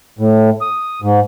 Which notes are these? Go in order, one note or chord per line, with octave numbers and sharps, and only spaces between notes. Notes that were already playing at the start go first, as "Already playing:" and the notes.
A2
D#6
G#2